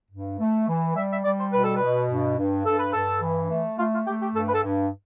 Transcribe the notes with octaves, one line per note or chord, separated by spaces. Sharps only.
G2
A3
E3
G3 E5
E5
G3 D5
C5
B2 B4
A4
B4
B2
G2
G2
G2 A4
B4
G2 A4
E3
A3
A3 F4
F4
A3 G4
G4
G2 A4
B4
A4
G2